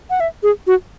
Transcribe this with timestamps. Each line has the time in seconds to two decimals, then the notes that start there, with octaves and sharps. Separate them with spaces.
0.10 F#5
0.20 E5
0.43 G#4
0.67 F#4